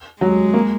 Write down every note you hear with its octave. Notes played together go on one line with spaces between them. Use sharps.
F#3 G#3
A#3